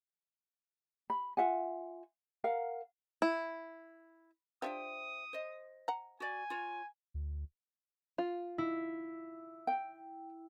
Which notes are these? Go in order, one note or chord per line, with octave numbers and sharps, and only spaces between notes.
B5
F4 E5 F#5 G#5
A#4 F5 F#5
E4
D4 F4 G4 C5 E5 G5 D#6
C5 D#5
F#5 A#5
F#4 D5 G#5
F4 C#5
D2
F4
E4
G5